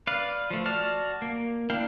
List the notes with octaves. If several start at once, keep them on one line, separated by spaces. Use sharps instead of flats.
B4 D5 F5
F3 A3
F#4 D5 A5 F6
A#3
A#3 D4 E4 F5 G5